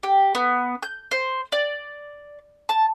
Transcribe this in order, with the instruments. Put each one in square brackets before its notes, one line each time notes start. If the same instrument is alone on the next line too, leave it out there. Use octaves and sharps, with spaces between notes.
[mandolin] G4
B3
G6
C5
D5
A5